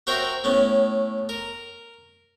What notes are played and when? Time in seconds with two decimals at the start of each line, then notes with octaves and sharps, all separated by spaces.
0.07 F#4 A#4 C5 E5 G5 A#5
0.44 A2 B3 C#4
1.29 A#4